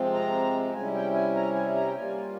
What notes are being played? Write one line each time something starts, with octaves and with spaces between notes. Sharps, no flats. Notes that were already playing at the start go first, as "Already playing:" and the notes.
Already playing: C3 F3 G#3 C4
A#5
C3 G3 C#4 E4 G#5
G5
G#5
A#5
G#5
A#5
G5
G3 A#3 F4 G#5